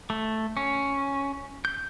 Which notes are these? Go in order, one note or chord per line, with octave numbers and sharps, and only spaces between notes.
A3
C#4
G6